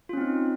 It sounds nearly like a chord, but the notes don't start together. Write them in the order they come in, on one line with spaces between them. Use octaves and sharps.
F4 C#4 C4 D#4